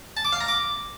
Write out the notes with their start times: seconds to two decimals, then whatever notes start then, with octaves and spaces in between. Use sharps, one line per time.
0.17 A5
0.25 D6
0.33 F5
0.41 A#5
0.48 D6